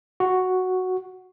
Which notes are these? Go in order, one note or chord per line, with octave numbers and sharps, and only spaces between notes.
F#4